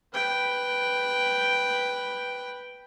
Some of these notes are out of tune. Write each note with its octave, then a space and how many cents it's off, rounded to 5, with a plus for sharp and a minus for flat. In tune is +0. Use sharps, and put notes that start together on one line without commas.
B4 +0 G5 +0